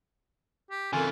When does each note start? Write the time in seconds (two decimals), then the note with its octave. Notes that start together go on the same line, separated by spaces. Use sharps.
0.70 G4
0.93 C#3 E3 C4 F4 A4 A#4 G#5